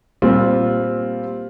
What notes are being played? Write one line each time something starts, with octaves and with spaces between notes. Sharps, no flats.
A#2 G3 C4 F4